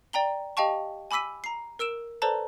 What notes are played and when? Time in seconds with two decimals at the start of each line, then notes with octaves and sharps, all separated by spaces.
0.13 D5 G5 A#5 G7
0.57 G4 D#5 F5 G5 A5 C#6
1.11 G#5 B5 D6 E6 B6 D#7
1.44 A#5 C7
1.79 A#4 E6 D7 E7
2.22 A4 B4 C5 D5 A5 A#5